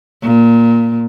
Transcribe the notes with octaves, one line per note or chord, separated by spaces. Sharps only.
A#2